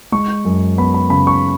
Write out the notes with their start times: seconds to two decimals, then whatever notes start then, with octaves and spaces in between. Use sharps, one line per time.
0.12 G#3 C#6
0.45 F#2
0.78 B3 B5
0.94 B5
1.10 C#3 B5
1.27 C#6